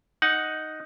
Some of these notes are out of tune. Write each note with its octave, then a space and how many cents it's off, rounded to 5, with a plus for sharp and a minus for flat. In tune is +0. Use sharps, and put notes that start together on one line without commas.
D#4 +0 F#5 +0